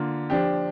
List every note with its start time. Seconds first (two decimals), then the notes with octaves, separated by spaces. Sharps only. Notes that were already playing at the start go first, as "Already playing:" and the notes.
Already playing: D3 A#3 F4
0.30 F3 D4 G4